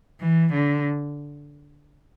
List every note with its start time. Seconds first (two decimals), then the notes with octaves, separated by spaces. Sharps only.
0.20 E3
0.54 D3